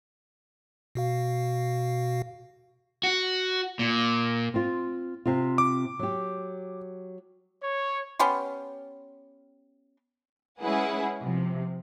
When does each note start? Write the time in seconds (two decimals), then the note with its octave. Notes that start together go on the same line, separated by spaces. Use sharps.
0.95 B2 F#4 F5
3.03 F#4
3.79 A#2
4.54 C4 F4
5.26 C3 C4 F4
5.58 D6
5.99 F#3 G4
7.61 C#5
8.19 B3 C#4 G4 C6
10.62 G#3 C#4 E4 G#4 B4 F#5
11.21 C3 F3